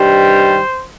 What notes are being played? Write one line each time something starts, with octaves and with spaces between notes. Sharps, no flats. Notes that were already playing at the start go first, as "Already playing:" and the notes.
Already playing: G2 D#3 G3 C5